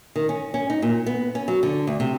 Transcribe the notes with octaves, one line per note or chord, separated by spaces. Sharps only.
D#3
C#4
C#4
D#4
A#2
B3
C#4
F#3
D3
D2
C3